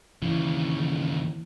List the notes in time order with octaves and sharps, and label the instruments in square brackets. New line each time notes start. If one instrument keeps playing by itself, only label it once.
[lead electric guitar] D#2 C#3 [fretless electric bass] E3